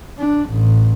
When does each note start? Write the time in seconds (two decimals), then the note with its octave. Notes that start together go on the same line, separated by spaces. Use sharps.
0.19 D4
0.50 A1